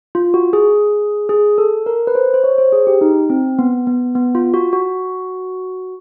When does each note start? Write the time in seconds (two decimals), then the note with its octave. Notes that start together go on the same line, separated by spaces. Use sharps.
0.15 F4
0.34 F#4
0.53 G#4
1.29 G#4
1.58 A4
1.86 A#4
2.07 B4
2.15 C5
2.34 C5
2.44 C#5
2.58 C5
2.72 G#4
2.87 G4
3.01 D#4
3.30 C4
3.59 B3
3.87 B3
4.15 B3
4.35 F4
4.54 F#4
4.73 F#4